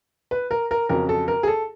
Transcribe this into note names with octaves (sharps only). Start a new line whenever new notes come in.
B4
A#4
A#4
F2 C#3 F#3 A#4
A4
A#4
G#4
A4